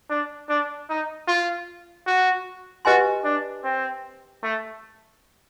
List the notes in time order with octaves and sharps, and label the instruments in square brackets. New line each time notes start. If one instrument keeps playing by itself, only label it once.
[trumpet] D4
D4
D#4
F4
F#4
[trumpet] F#4 [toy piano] G4 B4 D#5 G#5 C6
[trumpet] D4
C4
A3